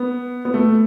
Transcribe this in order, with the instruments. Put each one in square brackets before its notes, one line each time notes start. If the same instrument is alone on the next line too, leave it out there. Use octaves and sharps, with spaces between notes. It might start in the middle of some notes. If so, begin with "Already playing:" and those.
Already playing: [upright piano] B3
B3
A3